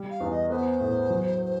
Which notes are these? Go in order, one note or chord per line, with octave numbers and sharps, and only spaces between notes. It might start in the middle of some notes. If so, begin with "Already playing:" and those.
Already playing: G3
F5
E2
D#5
B3 C5
A2
F#3